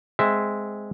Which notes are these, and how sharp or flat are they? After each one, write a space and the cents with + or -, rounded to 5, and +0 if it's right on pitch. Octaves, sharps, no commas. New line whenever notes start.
G#3 +0 C4 -15 E5 +0